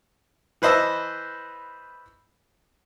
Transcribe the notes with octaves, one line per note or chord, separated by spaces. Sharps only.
E3 B4 C5 D#5 A5 E6